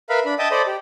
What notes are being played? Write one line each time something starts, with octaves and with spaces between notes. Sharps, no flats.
A#4 B4 E5 F5 B5
D4 B5
D#5 E5 G5 A5 D#6
A4 C5 D5 D#5 B5
G4